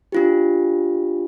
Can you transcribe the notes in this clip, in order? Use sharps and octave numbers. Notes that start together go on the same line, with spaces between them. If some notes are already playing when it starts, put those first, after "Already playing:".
D4 F4 G4